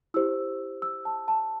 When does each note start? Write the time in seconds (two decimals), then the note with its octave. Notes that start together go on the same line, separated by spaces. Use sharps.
0.14 E4 G4 C5 E6
0.82 E6
1.05 A5
1.28 A5